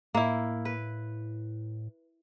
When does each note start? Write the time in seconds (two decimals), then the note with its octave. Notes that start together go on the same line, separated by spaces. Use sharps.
0.15 A2 A#3 E4
0.65 B4